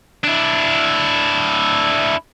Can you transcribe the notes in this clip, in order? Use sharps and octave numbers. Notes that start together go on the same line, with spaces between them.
D4 E4